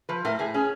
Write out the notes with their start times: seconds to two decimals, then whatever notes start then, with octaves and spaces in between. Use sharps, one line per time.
0.09 F3 B4
0.25 A2 A#4
0.39 A2 G#4
0.54 C#4 G#4